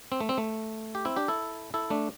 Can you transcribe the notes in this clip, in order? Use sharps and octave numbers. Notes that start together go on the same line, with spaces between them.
C4
A3
C4
A3
G4
C4 E4
D4 G4
E4 A4
E4 A4
A3 D4